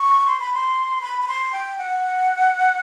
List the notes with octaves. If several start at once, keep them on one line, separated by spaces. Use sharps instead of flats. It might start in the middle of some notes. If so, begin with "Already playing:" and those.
Already playing: C#6
C6
B5
C6
B5
B5
C6
G5
F#5